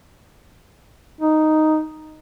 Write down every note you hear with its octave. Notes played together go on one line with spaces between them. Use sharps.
D#4